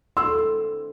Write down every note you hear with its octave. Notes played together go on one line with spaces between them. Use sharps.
D3 C4 E4 C6 E6